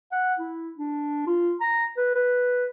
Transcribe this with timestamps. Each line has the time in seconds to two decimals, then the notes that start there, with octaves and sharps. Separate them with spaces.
0.12 F#5
0.39 E4
0.78 D4
1.26 F4
1.61 A#5
1.97 B4
2.15 B4